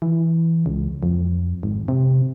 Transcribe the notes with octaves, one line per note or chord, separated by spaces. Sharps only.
E3
C#2
F2
G#1
C3